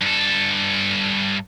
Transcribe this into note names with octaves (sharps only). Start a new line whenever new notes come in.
G2 A4